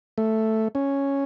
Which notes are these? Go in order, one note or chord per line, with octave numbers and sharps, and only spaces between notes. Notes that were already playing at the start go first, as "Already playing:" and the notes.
A3
C#4